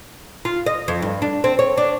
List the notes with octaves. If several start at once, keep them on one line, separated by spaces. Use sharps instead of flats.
F4
D#5
F2
G2
D4
C4
C#5
D4